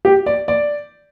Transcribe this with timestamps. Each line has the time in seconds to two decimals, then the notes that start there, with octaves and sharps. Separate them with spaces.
0.05 G4
0.26 D5
0.48 D5